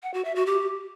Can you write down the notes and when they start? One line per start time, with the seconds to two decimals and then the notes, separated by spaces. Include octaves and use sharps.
0.03 F#5
0.14 F#4
0.25 E5
0.35 F#4
0.46 G4